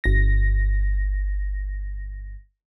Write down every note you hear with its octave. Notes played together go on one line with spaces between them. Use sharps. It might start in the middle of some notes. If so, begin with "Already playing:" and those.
G1 A#6